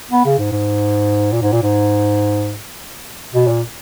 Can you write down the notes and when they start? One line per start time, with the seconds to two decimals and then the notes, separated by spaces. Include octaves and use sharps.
0.12 B3
0.25 C#3
0.38 G#2
0.52 G#2
1.32 A#2
1.42 G#2
1.52 A#2
1.63 G#2
3.34 B2
3.47 A#2